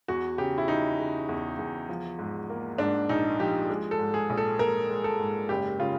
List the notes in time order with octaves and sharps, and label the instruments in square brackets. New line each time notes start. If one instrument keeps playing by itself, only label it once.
[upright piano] E2 F#4
C#3 G4
E4
C#3 D#4
C#3
E2
E2
F3
G#2
A#3
G#2 D4
A#1 D#4
F3 G4
G#3
A4
G#2
G#4
A#1
A4
A#1 A#4
G#3
A4
G#2
F#1 G4
C#3 F4